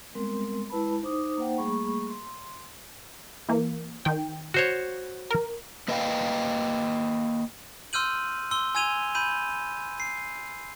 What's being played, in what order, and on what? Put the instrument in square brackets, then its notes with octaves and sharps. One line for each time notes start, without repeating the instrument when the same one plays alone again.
[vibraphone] G3 G#3 B3 C4 A#4 C6
G#3 E4 B4 A5 B5
D#4 C5 D6 D#6
A#3 D#4 C5 F#5 G5
G3 A3 A#3 G#4 B5 C#6
C6
[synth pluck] E3 A#3
D#3 G5
[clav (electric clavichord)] F#4 C5 C#5
[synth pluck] A#4
[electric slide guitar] A#3 B4 D#5 F5 G5
[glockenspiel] C6 E6 F6 G6 D#7 F#7
C6 E6 G7
G#5 E6 G#6 D#7 F7 G7
B5 G6 D#7
C7